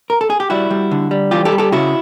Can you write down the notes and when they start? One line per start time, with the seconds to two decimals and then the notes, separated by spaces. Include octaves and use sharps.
0.10 A#4
0.21 A4
0.30 G#4
0.40 G4
0.50 G3 E4 F#4
0.71 G3
0.91 D3
1.11 G3
1.31 E3 F4 G4
1.45 G4 A4
1.52 G3
1.58 G4 A4
1.72 C#3 E4 F#4